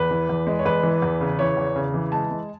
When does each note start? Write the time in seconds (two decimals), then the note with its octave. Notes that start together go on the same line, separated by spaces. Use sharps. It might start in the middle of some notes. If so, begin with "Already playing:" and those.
Already playing: E2 B4
0.11 E3
0.29 E2
0.47 G#3
0.59 C#5
0.65 E2 B4
0.83 E3
1.02 E2
1.21 C#3
1.39 E3 C#5
1.57 E2
1.76 C#3
1.94 E3
2.12 G#3 A5
2.31 G#3